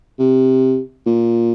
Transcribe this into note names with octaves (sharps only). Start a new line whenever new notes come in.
C3
A#2